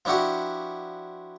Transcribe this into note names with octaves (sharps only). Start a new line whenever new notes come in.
F3 D4 E4 F#4 G4